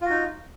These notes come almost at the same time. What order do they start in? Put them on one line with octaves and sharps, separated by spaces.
F4 F#4 D#4